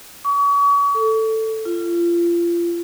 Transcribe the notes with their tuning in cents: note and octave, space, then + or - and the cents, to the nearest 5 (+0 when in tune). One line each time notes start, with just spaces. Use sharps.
C#6 +40
A4 +10
F4 -30